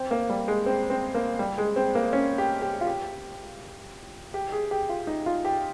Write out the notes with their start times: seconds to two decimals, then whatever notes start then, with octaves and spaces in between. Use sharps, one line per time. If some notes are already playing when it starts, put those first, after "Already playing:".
Already playing: C4
0.11 A#3
0.29 G3
0.48 G#3
0.66 C4
0.90 C4
1.15 A#3
1.39 G3
1.58 G#3
1.76 C4
1.95 A#3
2.13 C#4
2.38 G4
2.62 G4
2.81 F4
2.87 G4
4.34 G4
4.52 G#4
4.71 G4
4.89 F4
5.07 D#4
5.26 F4
5.45 G4